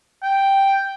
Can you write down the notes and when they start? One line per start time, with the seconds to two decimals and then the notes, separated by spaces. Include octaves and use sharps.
0.23 G5